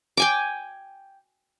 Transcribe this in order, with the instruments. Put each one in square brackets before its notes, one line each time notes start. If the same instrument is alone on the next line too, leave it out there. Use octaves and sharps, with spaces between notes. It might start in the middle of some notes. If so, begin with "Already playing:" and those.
[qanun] G5 G#5 D6